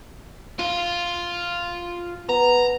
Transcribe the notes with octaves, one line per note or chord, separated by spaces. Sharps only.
F4 F5
B3 A#5